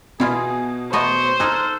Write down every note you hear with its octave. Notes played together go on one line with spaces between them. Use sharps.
B2 E4 F4 G#4
A3 B3 C5 D#5 C#6
D#4 G#4 A4 F6 F#6